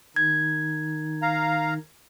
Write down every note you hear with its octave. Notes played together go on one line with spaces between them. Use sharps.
D#3 D#4 G#6
F5 A#5